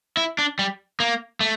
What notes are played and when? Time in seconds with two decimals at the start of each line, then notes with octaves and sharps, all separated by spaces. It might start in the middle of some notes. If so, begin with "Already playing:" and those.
0.17 E4
0.39 D4
0.59 G3
1.00 A#3
1.41 A3